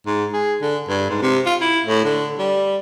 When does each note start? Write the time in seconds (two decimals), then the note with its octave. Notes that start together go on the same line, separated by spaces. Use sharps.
0.07 G#2
0.33 G#4
0.62 D3
0.88 G2
1.10 G#2
1.22 C3
1.46 F4
1.61 E4
1.85 A2
2.04 D3
2.38 G3